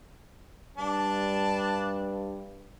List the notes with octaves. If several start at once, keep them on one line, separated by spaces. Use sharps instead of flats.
G2 D4 A5